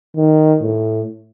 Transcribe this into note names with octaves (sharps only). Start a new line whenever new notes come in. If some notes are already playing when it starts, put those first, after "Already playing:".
D#3
A2